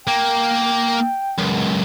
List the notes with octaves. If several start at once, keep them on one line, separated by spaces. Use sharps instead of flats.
A#3 G5
C#2 F#2